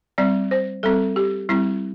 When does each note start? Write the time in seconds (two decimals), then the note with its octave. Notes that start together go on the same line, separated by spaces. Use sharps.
0.18 G3 C4 D5
0.51 C5
0.83 G3 C4 A4
1.16 G4
1.49 G3 C4 E4